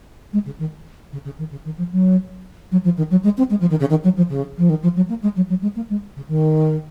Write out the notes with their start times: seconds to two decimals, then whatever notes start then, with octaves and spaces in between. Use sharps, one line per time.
0.33 G#3
0.46 C#3
0.59 D#3
1.12 C#3
1.25 C#3
1.38 D#3
1.51 C#3
1.65 D#3
1.78 F3
1.92 F#3
2.71 F#3
2.84 F3
2.97 D#3
3.10 F#3
3.23 G#3
3.37 C4
3.50 G#3
3.60 F3
3.70 D#3
3.80 C#3
3.90 D#3
4.04 F#3
4.17 F3
4.29 C#3
4.58 F3
4.69 D#3
4.82 F3
4.96 F#3
5.09 A#3
5.22 G#3
5.36 F#3
5.49 F#3
5.62 G#3
5.76 A#3
5.90 G#3
6.16 C#3
6.28 D#3